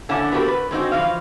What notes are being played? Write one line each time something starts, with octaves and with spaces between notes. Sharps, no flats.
D3 A#3 C#4 E4 F#5 A5
B3 C4 F#4 G4 A4 A#4
B4
G#3 C4 D#4 F#4
E3 F3 F5